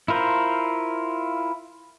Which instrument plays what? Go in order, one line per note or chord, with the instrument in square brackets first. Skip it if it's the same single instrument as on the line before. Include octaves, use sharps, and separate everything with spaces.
[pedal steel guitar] E4 F4 A#4 C5